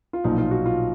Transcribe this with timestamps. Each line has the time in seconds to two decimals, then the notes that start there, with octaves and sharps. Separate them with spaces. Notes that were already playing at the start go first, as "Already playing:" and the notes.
0.13 F4
0.24 B1 A#2 F3 D#4
0.38 F4
0.51 F#4
0.65 F4